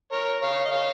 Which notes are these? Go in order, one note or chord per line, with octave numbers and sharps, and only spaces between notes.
A#4 C#5
C#5 F5
D#5
C#5 F5